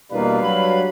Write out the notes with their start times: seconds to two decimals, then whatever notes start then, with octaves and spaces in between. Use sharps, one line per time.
0.11 E2 B2 G3 A#3 D4 B4 F5
0.41 F#3 B5